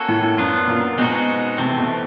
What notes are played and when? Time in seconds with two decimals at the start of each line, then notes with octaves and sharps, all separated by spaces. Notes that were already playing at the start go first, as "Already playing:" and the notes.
Already playing: A#3 C#4 F#4 A4 C#5
0.08 A2
0.23 A2
0.38 F#2 F#3 B3 D4 F4
0.68 A#2
0.98 B2 G#3 C4 D#4 F#4
1.58 C3 E3 A3 C4
1.78 B2